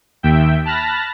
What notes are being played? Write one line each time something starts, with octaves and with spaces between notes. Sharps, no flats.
D#2 E5 G5
A5 B5 F6 F#6 A6 A#6